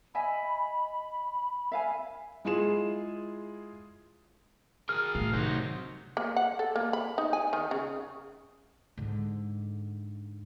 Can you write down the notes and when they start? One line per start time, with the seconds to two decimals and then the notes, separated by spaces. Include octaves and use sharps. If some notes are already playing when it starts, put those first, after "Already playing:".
0.15 D#5 E5 G#5 B5
1.72 E5 F5 G#5
2.45 G#3 E4 F4 G#4 E7
4.89 G#4 A#4 F6
5.15 A2 F5
5.33 C3 D#3 F#3 F#4 C5
6.17 A#3
6.36 F#5
6.59 A4
6.76 A#3
6.93 B5
7.18 D#4
7.33 G#5
7.53 D#3
7.71 C#3
8.97 G#2 D3